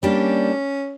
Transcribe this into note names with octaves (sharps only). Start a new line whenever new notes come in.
G3 A#3 C#4 D4 G4